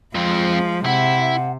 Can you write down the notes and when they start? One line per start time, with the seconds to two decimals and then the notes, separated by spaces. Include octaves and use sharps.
0.15 F2 F3 G#3 C4
0.86 C3 E4 F#5